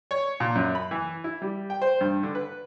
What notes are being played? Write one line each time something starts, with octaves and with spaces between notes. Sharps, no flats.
C#5
A#2
F#2
B5
E3
E4
G3
G5
C5
G2
D3
B4